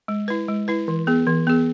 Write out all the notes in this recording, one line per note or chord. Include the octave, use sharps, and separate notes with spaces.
G#3
E4 B4
G#3
E4 B4
E3
B3 G#4
E3
B3 G#4